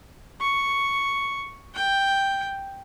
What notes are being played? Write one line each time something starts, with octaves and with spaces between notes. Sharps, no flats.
C#6
G5